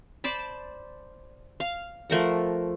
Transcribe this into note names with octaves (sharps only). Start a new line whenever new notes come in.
C5 D5 A5 B5
F5
F3 A3 A#4 F#5